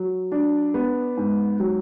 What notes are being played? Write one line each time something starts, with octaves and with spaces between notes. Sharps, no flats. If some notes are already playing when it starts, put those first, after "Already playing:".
Already playing: F#3
D4
B3
G#2
F#3